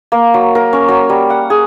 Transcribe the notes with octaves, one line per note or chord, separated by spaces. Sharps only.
A#3
F#3
A#4
C#4
F#3
G3
F#5
G#4